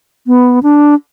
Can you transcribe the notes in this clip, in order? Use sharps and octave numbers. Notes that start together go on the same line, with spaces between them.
B3
D4